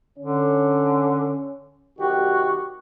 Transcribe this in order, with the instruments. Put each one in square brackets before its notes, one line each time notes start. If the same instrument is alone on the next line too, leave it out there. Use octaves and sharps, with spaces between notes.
[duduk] D3 [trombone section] C#4
[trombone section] C2 D#3 G4 [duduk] F#4